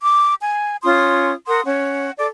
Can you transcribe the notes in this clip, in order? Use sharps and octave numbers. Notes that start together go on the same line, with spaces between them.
D6
G#5
C#4 F4 C6 D#6
A#4 F#5 C6 D#6
C#4 F#5
A4 D5 D6